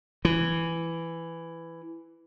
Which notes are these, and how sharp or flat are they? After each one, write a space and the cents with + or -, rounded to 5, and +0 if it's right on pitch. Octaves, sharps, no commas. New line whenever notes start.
E3 +10